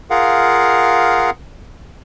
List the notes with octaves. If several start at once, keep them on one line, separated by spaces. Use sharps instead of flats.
F4 G#4 A#4 F5 F#5